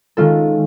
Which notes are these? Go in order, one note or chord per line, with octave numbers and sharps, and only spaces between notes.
D#3 G#3 C#4 F4 A4